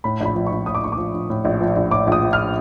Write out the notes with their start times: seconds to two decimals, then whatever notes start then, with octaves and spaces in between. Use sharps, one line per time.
0.04 A2 B5
0.21 A#1 B5
0.35 F3
0.47 A#1 C#6
0.66 A2 D#6
0.75 D6
0.82 A#1 C#6
0.92 D6
0.98 F3
1.14 A#1
1.30 A2
1.45 A#1
1.61 F3
1.76 A#1
1.91 A2 D6
2.07 A#1 D#6
2.22 F3
2.33 F6